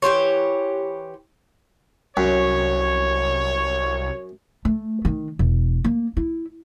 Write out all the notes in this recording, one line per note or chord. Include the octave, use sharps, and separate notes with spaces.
E3 G4 C5 C#5
C2 F#2 C#5
A3
D#3
E1
A#3
E4